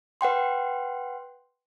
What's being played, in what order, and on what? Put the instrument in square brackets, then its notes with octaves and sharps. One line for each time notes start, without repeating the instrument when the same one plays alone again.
[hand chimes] B4 F#5 G5 C6